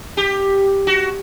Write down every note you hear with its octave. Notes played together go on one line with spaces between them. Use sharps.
G4
F#4